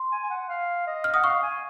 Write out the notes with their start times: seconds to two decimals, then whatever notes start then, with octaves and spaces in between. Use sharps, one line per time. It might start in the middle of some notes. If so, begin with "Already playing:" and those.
Already playing: C6
0.11 G#5
0.23 G#5
0.30 F#5
0.49 F5
0.86 D#5
1.04 F6
1.14 F#5 D#6
1.24 F5 C#6
1.42 G#5